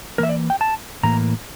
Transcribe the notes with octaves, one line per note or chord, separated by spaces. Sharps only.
E3 A#3 A#4 E5
D5
G5
A5
A2 E3 A#3 A#5